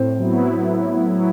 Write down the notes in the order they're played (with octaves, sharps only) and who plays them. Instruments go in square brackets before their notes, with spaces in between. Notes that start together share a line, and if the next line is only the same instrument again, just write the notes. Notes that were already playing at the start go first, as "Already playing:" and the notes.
Already playing: [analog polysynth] A2 [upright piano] C4
[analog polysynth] F#3 B3 E4
A2
F#3 B3 E4